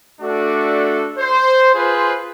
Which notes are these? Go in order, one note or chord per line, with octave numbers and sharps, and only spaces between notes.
A3 D4 F#4 A4 D5
C5
F4 G#4 B4 C5